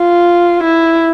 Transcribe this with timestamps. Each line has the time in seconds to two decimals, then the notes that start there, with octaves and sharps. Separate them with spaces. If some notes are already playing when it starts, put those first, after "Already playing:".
Already playing: F4
0.63 E4